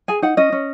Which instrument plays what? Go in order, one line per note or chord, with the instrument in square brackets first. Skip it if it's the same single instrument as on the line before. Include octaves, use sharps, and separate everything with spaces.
[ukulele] G#4 G#5
D#4 F#5
C#4 D#5
C#4